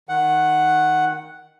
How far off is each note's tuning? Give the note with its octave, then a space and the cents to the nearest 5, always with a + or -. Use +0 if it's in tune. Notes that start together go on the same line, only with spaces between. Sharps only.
D#3 +0 F#5 +0